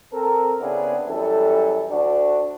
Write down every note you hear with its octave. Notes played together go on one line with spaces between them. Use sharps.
C4 A4 A#4
C#3 B3 C4 D4 E4 G#4
F#2 E3 G3 A4
D2 D4 F#4